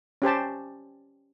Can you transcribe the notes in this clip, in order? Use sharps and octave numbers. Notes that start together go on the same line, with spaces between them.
C#4 G4 C5 A5